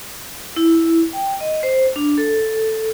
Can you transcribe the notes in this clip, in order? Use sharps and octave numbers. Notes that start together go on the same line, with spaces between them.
E4
G5
D#5
C5
D4
A4